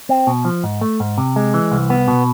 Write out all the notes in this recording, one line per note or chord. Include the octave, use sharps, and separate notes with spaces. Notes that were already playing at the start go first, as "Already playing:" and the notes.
C4
B2
F3
G#2
A3
G#2
C3
G#3
E3
C2
B3
B2